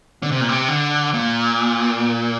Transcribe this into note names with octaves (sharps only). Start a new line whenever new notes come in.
D3
C3
A#2
C3
D3
A#2